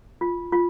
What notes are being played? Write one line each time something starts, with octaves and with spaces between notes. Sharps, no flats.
F4
F4